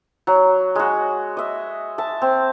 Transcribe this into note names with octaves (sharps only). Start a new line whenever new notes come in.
F#3
G#3 F#4
D#5 E5
E5 A5
C4